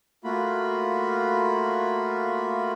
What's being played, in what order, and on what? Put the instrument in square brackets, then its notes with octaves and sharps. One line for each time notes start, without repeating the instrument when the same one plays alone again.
[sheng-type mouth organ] A3 A#3 F4 F#4 B5